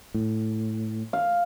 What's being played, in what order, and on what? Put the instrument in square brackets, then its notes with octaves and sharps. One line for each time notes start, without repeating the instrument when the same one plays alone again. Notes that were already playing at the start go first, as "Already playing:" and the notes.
[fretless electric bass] A2
[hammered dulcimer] F5